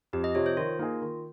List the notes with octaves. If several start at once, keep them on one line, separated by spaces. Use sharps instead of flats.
F2 G4
D#5
C3 F3 C#5
C5
D#3 F4
A#3 D#4 G#4
D#3